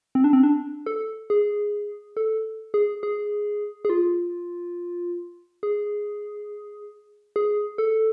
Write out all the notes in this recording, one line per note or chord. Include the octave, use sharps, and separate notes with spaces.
C4
D4
C4
D4
A4
G#4
A4
G#4
G#4
G#4
F4
G#4
G#4
A4